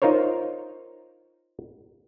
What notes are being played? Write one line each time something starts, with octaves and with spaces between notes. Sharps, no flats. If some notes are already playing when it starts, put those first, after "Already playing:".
D#4 F4 A#4 C5 C#5